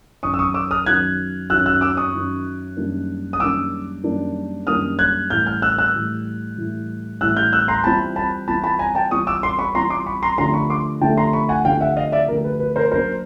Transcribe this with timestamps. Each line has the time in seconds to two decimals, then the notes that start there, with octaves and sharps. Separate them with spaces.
0.23 F#2 D#3 F#3 C#6 D#6
0.34 E6
0.39 C#6 D#6
0.54 D6 E6
0.71 D#6 F6
0.86 F#2 D#3 F#3 F#6 G#6
1.50 F#2 D#3 F#3 E6 F#6
1.66 E6 F#6
1.81 D6 E6
1.97 C#6 D#6
2.13 F#2 D#3 F#3
2.77 F#2 D#3 G3 A#3 D4
3.33 D#6
3.40 F#2 D#3 G3 A#3 D4 D6 E6
4.03 F#2 D#3 G3 A#3 D4
4.67 F#2 D#3 G3 A#3 D4 D#6 F6
4.99 F#6 G#6
5.30 A2 E3 G3 F6 G6
5.46 F6 G6
5.62 E6 F#6
5.78 E6 F#6
5.94 A2 E3 G3
6.57 A2 E3 G3
7.21 A2 E3 G3 E6 F#6
7.37 F6 G6
7.53 E6 F#6
7.68 A#5 C6
7.84 E3 G3 C4 F4 A5 B5
8.16 A5 B5
8.48 E3 G3 C4 F4 A5 B5
8.64 A5 B5
8.79 G#5 A#5
8.95 G5 A5
9.11 E3 G3 C4 F4 C#6 D#6
9.27 D6 E6
9.43 C6 D6
9.59 B5 C#6
9.74 E3 G3 C4 F4 A#5 C6
9.90 C6 D6
10.06 B5 C#6
10.23 A#5 C6
10.38 D3 F3 A3 D4 G4 A#5 C6
10.54 B5 C#6
10.70 C6 D6
11.01 D3 F3 A3 D4 G4 G5 A5
11.17 A#5 C6
11.33 B5 C#6
11.49 F#5 G#5
11.65 D3 F3 A3 D4 G4 F5 G5
11.81 E5 F#5
11.97 D#5 F5
12.12 D5 E5
12.28 D3 F3 A3 D4 G4 A#4
12.44 B4
12.60 B4
12.76 A#4 C5
12.91 F#3 A#3 D4 A#4 C5